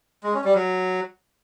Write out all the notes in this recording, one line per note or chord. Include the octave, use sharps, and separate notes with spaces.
G#3
C#4
G3
F#3